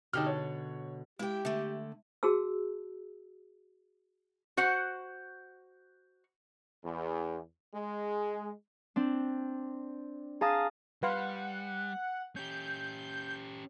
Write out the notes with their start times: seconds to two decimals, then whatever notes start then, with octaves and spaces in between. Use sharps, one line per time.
0.13 B2 D3 D#4 G4 A5 F6
0.26 C#5
1.19 G#3 E4 G4 G5
1.45 D3 A3 E5
2.23 F#4 G#4 A5 E6
4.57 F#4 C5 F#5
6.84 E2
7.74 G#3
8.96 C4 D4
10.41 G#4 F5 A5 A#5 D#6
11.03 G3 B4 F5 F#5 C6
12.36 C#4 G4 G6